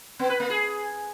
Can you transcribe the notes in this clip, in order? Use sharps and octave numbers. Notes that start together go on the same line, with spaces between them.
B3
B4
A#3
G#4